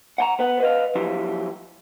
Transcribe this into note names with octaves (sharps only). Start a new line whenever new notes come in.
F#5 G5 A#5
B3 B4 F#5
B4 D#5 F5
F3 F#3 E4 G4